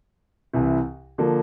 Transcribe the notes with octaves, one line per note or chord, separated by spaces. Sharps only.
C2 C3 E3
D3 F3 A#3